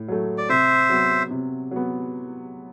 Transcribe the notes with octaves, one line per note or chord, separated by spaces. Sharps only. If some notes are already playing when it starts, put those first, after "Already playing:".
Already playing: A2
F#3 A3
D5
C3 C5 E5
F#3 B3
C3
F#3 B3